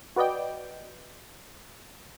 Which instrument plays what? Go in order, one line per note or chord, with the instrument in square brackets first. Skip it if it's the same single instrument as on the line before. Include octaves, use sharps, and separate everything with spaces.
[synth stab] F#4 B4 D5 D#5 G5